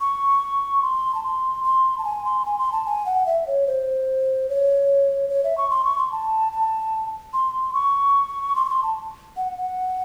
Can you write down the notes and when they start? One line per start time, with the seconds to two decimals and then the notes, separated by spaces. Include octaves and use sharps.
0.01 C#6
0.82 C6
1.15 A5
1.24 C6
1.64 C6
1.98 A5
2.04 G#5
2.25 C6
2.45 G#5
2.58 C6
2.72 A5
2.86 G#5
3.06 F#5
3.26 E5
3.47 C#5
3.67 C5
4.49 C#5
5.30 C#5
5.44 E5
5.58 C#6
5.70 C6
5.85 C#6
5.98 C6
6.12 A5
6.52 A5
7.33 C6
7.74 C#6
8.56 C6
8.65 C#6
8.70 C6
8.83 A5
9.37 F#5
9.58 F#5